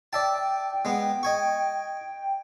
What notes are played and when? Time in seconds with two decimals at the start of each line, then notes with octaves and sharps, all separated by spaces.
0.13 D5 E5 G5 A5
0.85 G#3 B3
1.23 D#5 G#5 C#6